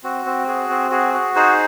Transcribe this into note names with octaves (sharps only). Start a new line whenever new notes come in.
C4 F#4
C4
F#4 G#4
C4
F#4 G#4
F#4
D#4 G#4 C5